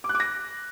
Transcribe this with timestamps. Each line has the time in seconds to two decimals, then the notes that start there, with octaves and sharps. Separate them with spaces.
0.04 D6
0.09 F#6
0.15 D6
0.20 A#6